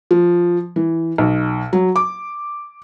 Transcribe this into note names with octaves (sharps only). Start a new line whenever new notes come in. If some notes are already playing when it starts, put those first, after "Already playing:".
F3
E3
B1
F#3
D6